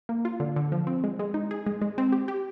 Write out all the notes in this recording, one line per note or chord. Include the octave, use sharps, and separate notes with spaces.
A#3
F4
D3
D3
F3
C4
G#3
G#3
D#4
G#4
G#3
G#3
C4
G4
G4